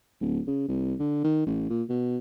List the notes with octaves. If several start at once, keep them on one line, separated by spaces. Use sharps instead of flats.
D1
C#3
C2
D3
D#3
A1
A#2
B2